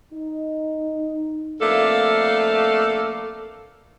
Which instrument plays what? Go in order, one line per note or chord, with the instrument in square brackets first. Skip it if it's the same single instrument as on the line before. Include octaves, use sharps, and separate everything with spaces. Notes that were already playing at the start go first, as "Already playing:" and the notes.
[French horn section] D#4
[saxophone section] F2 A3 A#3 D4 A4 F5